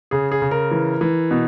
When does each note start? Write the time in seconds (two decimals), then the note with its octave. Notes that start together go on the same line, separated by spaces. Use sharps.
0.11 C#3 G#4
0.32 G#4
0.42 C#3
0.51 A#4
0.71 E3
1.01 E3
1.31 B2